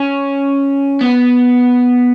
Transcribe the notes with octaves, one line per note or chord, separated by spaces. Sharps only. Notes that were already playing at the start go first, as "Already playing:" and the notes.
Already playing: C#4
B3